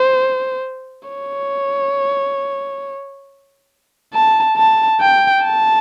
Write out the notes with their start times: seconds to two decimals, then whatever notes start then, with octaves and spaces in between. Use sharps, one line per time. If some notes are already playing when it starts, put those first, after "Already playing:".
Already playing: C5
1.09 C#5
4.14 A5
4.57 A5
5.01 G5
5.44 A5